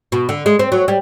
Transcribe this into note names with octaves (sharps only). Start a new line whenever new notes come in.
B2
D3
G#3
C4
F#3
G3